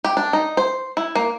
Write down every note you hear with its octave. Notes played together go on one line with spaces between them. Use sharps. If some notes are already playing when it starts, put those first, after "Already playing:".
G4
D4
D#4
C5
E4
A#3